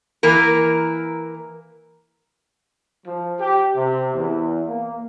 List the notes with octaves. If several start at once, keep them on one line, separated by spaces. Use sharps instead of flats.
E3 A#3 A#4
F3
G4
C3
E2
A#3